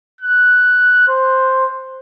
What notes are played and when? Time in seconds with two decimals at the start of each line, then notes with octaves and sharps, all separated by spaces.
0.21 F#6
1.08 C5